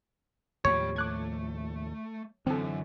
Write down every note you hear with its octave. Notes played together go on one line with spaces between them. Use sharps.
D#2 A2 F3 G4 C#5 B5
A3 D6 F#6 G#6
F#2 D3 E3 C4 A4